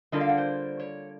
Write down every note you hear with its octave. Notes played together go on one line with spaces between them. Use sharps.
D3 G3 A#3 D4 F4 D#5
F5
F#5
C5
C#5